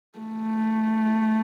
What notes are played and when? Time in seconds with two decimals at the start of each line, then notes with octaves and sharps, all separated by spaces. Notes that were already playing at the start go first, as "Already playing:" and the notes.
0.18 A3